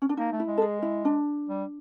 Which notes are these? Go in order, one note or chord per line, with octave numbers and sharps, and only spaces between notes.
C#4
D4
A#3 D#4
A3
E4
G#3
A4
G#4
E4
D4
G3